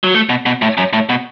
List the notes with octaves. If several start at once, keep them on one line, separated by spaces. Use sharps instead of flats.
F#3
A3
B2
B2
A2
F#2
A2
B2